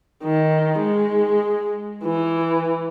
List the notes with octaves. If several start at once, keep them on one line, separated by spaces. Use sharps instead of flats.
D#3
G#3
E3